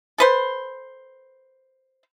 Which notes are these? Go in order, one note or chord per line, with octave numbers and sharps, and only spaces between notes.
A4 B4 C5